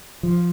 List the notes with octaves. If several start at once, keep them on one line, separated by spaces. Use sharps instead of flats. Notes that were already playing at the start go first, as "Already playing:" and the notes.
F3